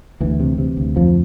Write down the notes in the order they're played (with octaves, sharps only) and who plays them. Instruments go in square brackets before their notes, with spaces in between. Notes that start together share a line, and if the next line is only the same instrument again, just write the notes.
[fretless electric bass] D2 E3
C3
C3
D2
F2 F3